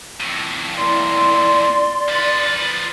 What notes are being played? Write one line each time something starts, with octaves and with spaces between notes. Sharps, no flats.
F2 A2
A#3 E4 D5 C6
F3 B4 A6 C#7